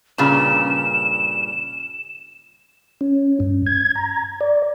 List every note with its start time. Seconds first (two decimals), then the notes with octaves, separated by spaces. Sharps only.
0.18 G2 A#2 C#3 E7
3.01 C#4
3.40 G2
3.66 G#6
3.95 A#5
4.41 D5